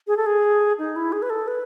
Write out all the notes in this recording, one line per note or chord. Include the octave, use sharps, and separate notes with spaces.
G#4
A4
G#4
D#4
E4
G#4
B4
A4
B4